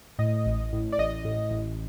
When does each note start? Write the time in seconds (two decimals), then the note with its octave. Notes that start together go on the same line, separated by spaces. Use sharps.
0.19 A2 D#5
0.46 A1
0.73 A2
0.92 D5
0.99 A1 D#5
1.25 A2
1.51 A1